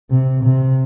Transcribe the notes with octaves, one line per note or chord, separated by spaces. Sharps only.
C3
C3